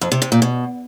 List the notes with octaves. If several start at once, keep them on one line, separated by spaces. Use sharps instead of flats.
F2
C3
C3
A#2
B2